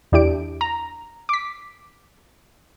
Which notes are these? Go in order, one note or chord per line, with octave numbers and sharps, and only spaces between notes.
E2 D4 E4 G4 D7
A#5
D6 B6